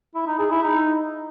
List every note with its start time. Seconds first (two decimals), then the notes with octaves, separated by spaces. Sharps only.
0.15 E4
0.27 D#4
0.39 G#4
0.51 E4
0.63 D#4